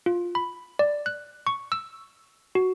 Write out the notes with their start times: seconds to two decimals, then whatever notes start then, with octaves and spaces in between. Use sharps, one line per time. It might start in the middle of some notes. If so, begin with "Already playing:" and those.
0.06 F4
0.35 B5
0.79 D5
1.06 F#6
1.47 C#6
1.72 E6
2.55 F#4